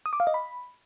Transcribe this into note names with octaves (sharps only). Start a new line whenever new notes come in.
D#6
D6
F5
D#5
B5